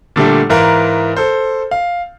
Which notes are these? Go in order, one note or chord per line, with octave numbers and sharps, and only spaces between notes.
A#2 D3 G3 A3
G#2 E3 A#4 F5 A#5
A4 C5
F5